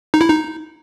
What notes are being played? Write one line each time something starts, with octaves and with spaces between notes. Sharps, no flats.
D#4
E4
D#4